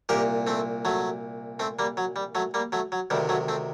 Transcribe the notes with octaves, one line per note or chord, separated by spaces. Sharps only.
C2 A#2 G4 A#4
A3 C4
F#3 A3
A3 C4
G3 A#3
F#3
G3
F#3 A3
G3 A#3
F#3 A3
F#3
D2 C3 D#3 G3
F#3 A3
A3 C4